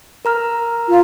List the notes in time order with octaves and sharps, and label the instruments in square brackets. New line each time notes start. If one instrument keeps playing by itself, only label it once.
[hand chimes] A#4 A#5 F6
[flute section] F4